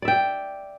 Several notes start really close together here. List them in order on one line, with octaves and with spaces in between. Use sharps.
D5 E5 G5